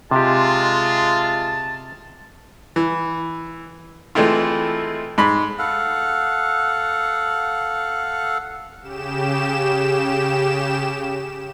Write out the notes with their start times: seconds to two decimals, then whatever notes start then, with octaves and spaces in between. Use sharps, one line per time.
0.11 C3 G#3 F4 G4 A5
2.76 E3
4.15 E3 G#3 A3 C4 E4 F4
5.18 G#2 B5
5.59 A4 F5 F#5
8.81 C#3 G4 E7